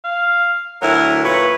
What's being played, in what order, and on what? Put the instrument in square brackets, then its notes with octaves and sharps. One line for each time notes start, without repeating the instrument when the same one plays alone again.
[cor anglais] F5
[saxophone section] D2 F#3 E4 [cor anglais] A#4
[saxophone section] A#2 C#5 [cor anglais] B4